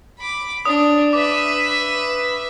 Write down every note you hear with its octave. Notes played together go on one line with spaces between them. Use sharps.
B5 D6
D4 D#6
B4 E5 D6